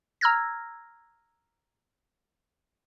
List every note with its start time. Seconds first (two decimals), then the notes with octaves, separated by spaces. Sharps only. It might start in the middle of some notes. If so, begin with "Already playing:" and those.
0.21 A#5 E6 F6 G#6 A#6